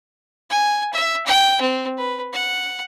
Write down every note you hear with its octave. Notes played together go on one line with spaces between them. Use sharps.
G#5
E5
G5
C4
B4
F#5